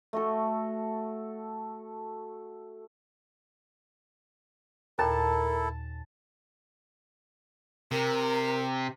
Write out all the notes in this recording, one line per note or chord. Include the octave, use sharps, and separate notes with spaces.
A3 F#4 A4
D#2 A#2 E4 A4 A#4 A5
C3 A#4